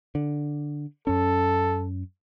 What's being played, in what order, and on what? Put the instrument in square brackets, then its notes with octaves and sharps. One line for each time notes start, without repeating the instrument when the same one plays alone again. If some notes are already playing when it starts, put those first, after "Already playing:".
[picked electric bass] D3
[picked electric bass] F#2 C#4 [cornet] A4